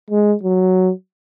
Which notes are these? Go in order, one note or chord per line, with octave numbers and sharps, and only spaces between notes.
G#3
F#3